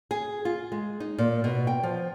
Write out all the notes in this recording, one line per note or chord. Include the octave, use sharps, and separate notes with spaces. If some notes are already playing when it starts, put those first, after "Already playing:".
G#4
F4
G#3
D#4
A#2
B2
G5
F3